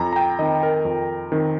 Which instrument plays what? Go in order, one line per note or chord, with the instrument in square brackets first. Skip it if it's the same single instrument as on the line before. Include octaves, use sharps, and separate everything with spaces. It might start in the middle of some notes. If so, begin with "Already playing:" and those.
Already playing: [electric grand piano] F2 A#5
A#5
G5
D#3 C4 D#5
A#4
F2
D#3 C4